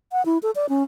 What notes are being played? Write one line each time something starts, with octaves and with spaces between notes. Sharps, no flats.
F#5
E4
A4
D5
C#4